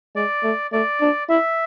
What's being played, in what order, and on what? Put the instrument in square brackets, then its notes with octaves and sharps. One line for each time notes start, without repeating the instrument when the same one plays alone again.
[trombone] G#3 [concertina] D5
[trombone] A3
[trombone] A3 [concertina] D5
[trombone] D4
[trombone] E4 [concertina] E5